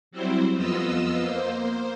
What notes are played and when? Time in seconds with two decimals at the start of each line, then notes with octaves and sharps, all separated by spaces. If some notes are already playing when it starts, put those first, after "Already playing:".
0.11 F#3 G3 C4 E4 C5
0.55 F2 B3 F4 D#5 E6
1.22 A#3 C5